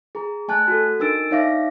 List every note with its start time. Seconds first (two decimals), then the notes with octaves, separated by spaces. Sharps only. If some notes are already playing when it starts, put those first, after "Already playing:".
0.15 G#4 A#5
0.48 A3 G#5 A5 F#6
0.68 F#4 A4
1.00 D4 D#4 A#4 E6 A6 D7
1.31 D#4 C#5 E5 F5 D6 A#6